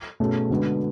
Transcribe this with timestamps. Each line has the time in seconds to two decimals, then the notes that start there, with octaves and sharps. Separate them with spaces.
0.20 B2 A3 C#4 G#4
0.50 D3 G#3 B3 F#4